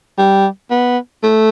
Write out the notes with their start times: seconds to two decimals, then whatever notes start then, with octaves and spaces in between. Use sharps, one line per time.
0.18 G3
0.70 B3
1.24 A3